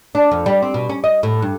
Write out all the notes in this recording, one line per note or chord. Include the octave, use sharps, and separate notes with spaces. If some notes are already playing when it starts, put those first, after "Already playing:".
D4
F2
G3
C4
B2
C#4
D#5
A2
G2